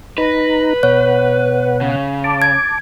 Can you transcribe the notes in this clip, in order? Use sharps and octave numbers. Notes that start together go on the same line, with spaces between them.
D#4 B4 A#5
B2 C#5 F#5
C#3
A5 D6
G#6